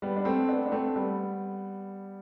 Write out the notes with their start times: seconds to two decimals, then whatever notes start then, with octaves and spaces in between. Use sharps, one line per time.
0.02 G3 B3
0.16 D4
0.25 A3 C4
0.49 B3 D4
0.66 D4
0.72 A3 C4
0.96 G3 B3